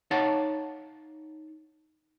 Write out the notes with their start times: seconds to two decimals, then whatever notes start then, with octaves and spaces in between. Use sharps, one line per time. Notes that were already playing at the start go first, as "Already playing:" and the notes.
0.11 D#4 C#5 F5 F#5 A5